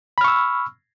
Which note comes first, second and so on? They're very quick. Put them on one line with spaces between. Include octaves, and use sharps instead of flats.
B5 F6 C#6 E6